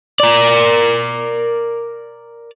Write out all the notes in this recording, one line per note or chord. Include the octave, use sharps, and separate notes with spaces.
A#4 D5